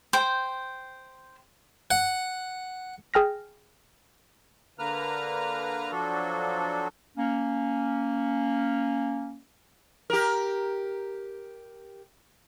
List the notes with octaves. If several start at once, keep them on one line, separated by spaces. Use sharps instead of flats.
C5 G5
F#5
G#4 G5 F6 A#6
D3 A#3 B4 A#5 F6
F3 F#3 D4 F#4 A4
A#3 C#4
G4 A#4